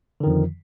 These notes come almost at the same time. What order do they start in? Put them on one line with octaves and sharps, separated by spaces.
D3 D#3 F2 F3